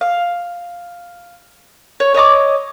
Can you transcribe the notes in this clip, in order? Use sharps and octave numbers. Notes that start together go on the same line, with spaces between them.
F5
C#5
C#5 D#5 A#5 D6